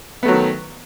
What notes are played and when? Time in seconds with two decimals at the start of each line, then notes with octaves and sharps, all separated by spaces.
0.23 B3
0.25 A3
0.28 F#3
0.31 D#3